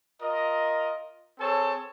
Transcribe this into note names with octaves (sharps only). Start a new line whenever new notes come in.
F4 A#4 D#5
C4 G#4 A4 C#5 A5